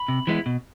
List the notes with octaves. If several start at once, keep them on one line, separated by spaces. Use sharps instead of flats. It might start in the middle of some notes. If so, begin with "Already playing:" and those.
Already playing: B5
C3
E3 G#3 B3 E4
B2